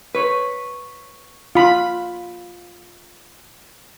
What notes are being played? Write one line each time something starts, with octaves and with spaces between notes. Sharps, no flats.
B4 C#5
F4 B5